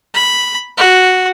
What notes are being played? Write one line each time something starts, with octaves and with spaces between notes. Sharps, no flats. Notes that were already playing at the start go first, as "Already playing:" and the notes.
B5
F#4